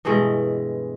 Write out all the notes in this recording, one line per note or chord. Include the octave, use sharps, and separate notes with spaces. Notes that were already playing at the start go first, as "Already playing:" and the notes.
G2 B2 E3 G#3